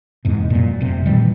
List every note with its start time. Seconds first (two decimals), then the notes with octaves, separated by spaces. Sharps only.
0.25 E2 G#2 C3
0.50 F#2 A#2
0.81 F1 C3
1.06 A#2 D#3 E3 G3